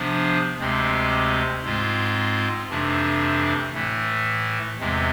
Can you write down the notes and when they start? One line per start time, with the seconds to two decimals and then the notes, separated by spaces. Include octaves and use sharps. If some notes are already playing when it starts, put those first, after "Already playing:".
Already playing: C3 F3 B3 D4
0.59 D2 C3 G#3 C4
1.63 G#2 G#3 C4 F4
2.69 F2 C3 E3 A3 D4
3.74 A2 E3 A3
4.80 E2 C3 E3 G#3 C4